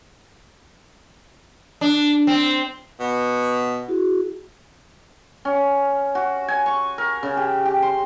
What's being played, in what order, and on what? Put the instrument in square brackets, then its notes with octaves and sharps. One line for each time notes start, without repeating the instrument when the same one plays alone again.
[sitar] D4
C4
[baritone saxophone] B2
[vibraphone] E4 F#4 G#4
[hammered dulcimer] C#4
F#4
G#5
C#6
A#4
C#3
G4
G4
C6